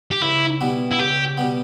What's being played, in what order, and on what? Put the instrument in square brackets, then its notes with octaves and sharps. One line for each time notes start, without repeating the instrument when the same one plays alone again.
[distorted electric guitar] G4
[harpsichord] C#2 [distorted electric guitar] E4
[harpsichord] B2 G3 B3
[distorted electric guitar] E4
[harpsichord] C#2 [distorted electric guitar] G4
[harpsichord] B2 G3 B3